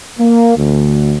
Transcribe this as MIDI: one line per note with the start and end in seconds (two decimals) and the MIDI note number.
0.19 0.55 58
0.57 1.17 38